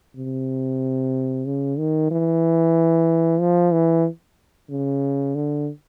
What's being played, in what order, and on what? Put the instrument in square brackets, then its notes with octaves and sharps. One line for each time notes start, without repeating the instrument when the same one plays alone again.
[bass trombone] C3
C#3
D#3
E3
F3
E3
C#3
D3